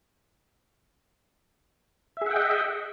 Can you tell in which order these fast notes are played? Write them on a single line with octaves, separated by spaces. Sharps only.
E5 G#4 F#5 G5 D#5